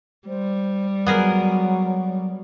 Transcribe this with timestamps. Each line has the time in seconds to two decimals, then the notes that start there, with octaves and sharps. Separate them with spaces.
0.28 G3 C5
1.06 F#3 B3 G#4 A#4